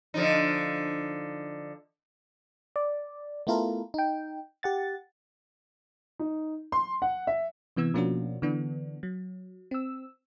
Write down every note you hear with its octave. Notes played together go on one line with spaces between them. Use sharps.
D3 F3 D#4
D5
A3 B3 E4 F4 A4 A#4
D#4 G5
G4 F#5 A6
D#4
C6
F#5
E5
C3 E3 B3 E6 G#6
B2 F3 A#3 C#4 D4 F#4
D3 E3 B3 D4
F#3
C4 E6